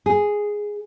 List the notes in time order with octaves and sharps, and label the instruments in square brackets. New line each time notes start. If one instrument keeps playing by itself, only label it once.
[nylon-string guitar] G#4